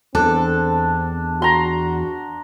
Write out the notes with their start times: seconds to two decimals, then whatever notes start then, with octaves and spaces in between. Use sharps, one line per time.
0.15 E2 C4 D4 A4
1.42 F#4 A#5 C6